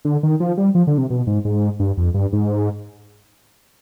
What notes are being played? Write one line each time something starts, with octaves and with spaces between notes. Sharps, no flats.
D3
D#3
F3
G3
F3
D3
C3
B2
G#2
G#2
G2
F2
G2
G#2